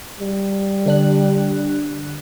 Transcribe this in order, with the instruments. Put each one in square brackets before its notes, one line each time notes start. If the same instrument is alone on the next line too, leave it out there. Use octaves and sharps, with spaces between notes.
[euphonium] G3
[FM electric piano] D3 D4 F#6